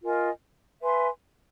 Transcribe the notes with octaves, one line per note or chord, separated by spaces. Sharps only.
F4 A#4 D#5 G#5
B4 E5 G#5 C6